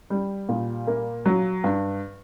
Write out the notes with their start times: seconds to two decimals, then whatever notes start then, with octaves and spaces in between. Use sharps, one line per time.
0.10 G3
0.49 A#2
0.87 A#3
1.26 F#3
1.64 G2